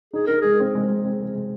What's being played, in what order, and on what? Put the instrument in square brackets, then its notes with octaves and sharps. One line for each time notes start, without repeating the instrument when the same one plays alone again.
[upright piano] D#4 [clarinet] G#4
[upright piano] D#4 [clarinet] A#4
[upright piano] G#3 [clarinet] G#4
[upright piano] C4
G#3
G#3
C4
G#3
G#3